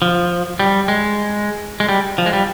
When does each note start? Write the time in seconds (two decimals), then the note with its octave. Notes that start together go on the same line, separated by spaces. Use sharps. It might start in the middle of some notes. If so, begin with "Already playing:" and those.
0.02 F3
0.60 G3
0.88 G#3
1.80 G#3
1.89 G3
2.18 F3
2.26 G#3
2.33 G3